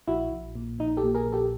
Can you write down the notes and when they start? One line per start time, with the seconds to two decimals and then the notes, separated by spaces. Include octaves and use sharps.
0.08 A#1 E4 F#4
0.31 A#1
0.55 A#2
0.79 A#1 D#4
0.97 G4 A4
1.04 A#2
1.14 G#4 A#4
1.27 A#1
1.32 G4 A4